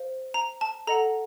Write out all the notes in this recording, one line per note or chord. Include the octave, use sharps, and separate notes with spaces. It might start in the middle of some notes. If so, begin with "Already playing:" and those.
Already playing: C5 F5
A#5
A5
A4 D#5 F#5 A#5